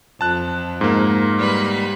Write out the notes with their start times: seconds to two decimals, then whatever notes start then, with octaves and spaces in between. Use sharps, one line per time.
0.21 F2 A5 F#6
0.81 G#2 A#3
1.38 G3 B4